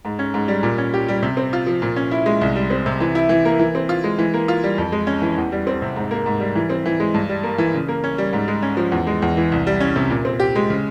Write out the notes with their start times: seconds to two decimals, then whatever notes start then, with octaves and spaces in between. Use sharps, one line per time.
0.05 G#2
0.19 C#4
0.34 G#2
0.48 G3
0.63 A#2
0.78 C#4
0.94 G4
1.08 G3
1.23 C3
1.37 C4
1.53 F4
1.67 F3
1.82 A#2
1.96 C#4
2.11 E4
2.26 G#3
2.41 C2
2.56 G3
2.70 C4
2.86 C3
3.00 E3
3.15 E4
3.29 E3
3.45 A#3
3.59 E3
3.75 C4
3.89 F4
4.04 G#3
4.19 E3
4.34 A#3
4.48 F4
4.64 G3
4.78 F2
4.92 G#3
5.07 C#4
5.22 E3
5.38 E2
5.52 G3
5.67 C4
5.82 C3
5.96 G#2
6.11 A#3
6.26 G#2
6.40 G3
6.55 E3
6.70 C4
6.86 E3
7.00 G#3
7.14 G2
7.29 G3
7.44 A#3
7.58 E3
7.74 C#3
7.89 A#3
8.04 C#4
8.18 G3
8.33 G#2
8.48 G#3
8.62 C#4
8.77 F3
8.92 E2
9.07 G#3
9.22 E2
9.37 E3
9.52 C2
9.67 G3
9.80 C#4
9.96 C3
10.10 A#2
10.25 C4
10.40 G4
10.55 G#3
10.70 C#3